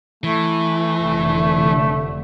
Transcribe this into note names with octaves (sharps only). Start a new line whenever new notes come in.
E3 A3
F1 D3